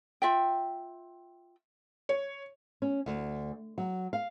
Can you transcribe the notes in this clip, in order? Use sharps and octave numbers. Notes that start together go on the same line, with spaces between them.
F4 E5 G5
C#5
C#4
D2
F#3
F5